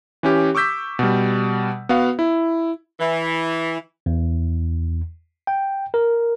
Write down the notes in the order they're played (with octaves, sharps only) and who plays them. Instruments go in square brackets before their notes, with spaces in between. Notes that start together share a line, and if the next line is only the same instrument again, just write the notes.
[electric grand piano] E3 C#4 G4
C#6 D6 E6 G6 B6
B2 G3
B3 F#4 F5
E4
[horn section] E3
[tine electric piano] E2
G5
A#4